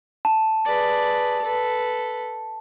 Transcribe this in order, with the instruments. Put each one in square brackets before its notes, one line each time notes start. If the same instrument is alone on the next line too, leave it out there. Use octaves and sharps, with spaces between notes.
[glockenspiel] A5
[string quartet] G#4 B4 D5
A4 B4